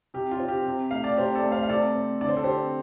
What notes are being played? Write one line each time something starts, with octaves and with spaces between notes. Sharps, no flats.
C3 G4
F4
C4
G4
C3
A3 F5
D5
C3 G4 C5
A4 D5
A3
C5 F5
F5
C3 A4 D5
C4
D3 D5
C5
A4
C4 G4 C5